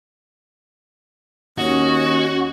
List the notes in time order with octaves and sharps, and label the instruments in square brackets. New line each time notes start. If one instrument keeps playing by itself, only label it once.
[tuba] D#2 [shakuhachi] C#4 [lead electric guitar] F#4 [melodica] D#5